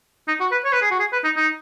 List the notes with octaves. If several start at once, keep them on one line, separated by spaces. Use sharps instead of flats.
D#4
F#4
B4
C#5
B4
G#4
F#4
G#4
B4
D#4
D#4